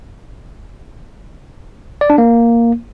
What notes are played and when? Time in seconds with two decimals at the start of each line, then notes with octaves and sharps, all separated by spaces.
2.01 D5
2.10 D4
2.18 A#3